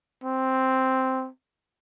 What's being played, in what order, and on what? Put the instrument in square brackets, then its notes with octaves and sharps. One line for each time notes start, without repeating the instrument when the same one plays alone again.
[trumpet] C4